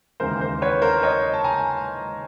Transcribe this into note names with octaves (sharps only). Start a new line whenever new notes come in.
D#2 C#3 E3 G#3 A#4 C5
A#4 C5
B4 C#5
A#4 C5
C#5 D#5
A5
G#5 A#5